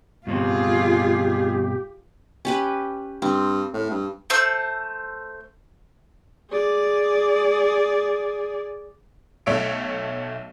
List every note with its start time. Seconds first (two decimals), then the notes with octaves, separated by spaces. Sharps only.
0.27 G2 B2 C4 F4 G4 G#4
2.45 C#4 G4 B4
3.22 G2 C4
3.74 A2
3.90 G2
4.30 A3 C5 A5 E6
6.50 G#4 D5
9.46 B1 A3 C#5 E5 D7